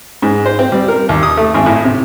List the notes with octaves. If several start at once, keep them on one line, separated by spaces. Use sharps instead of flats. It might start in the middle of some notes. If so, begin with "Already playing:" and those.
G#2
C5
C4
G3
A#4
D#2
D#6
A3
G#1
A2
C3